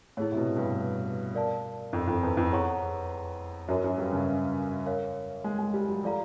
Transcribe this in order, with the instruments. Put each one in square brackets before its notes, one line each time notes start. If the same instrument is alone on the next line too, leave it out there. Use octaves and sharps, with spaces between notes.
[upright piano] A2 [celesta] E4 G#4 C#5
[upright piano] C3
B2
G2
[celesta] A#4 D5 F5 A5
[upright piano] F2
F2
E2
F2
[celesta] G#4 C#5 F#5 A#5 C#6
[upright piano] F#2 [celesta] F#4 A#4 C#5
[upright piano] F#2
G2
C#3
[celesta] A#4 C#5 F5
[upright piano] G#3
G#3
G3
F#3
[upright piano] F3 [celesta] F4 A4 D5 F5 A#5